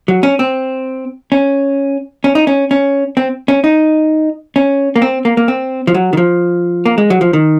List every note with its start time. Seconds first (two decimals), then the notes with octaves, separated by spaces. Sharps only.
0.08 F#3
0.23 C#4
0.39 C4
1.32 C#4
2.24 C#4
2.35 D#4
2.47 C#4
2.71 C#4
3.17 C4
3.48 C#4
3.64 D#4
4.56 C#4
4.96 A#3
5.02 C4
5.25 A#3
5.37 A#3
5.48 C4
5.87 F3
5.94 F#3
6.13 D#3
6.17 F3
6.85 A#3
6.98 G#3
7.10 F#3
7.21 F3
7.33 D#3